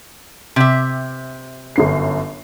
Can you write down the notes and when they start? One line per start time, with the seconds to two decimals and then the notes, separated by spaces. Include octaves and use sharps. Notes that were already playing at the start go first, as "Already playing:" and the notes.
0.56 C3 E5
1.76 G1 F#2 C7